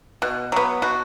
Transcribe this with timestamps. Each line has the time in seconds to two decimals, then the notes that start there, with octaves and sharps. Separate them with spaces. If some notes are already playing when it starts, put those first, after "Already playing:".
0.22 B2
0.52 F#3 B3
0.82 B2 F#4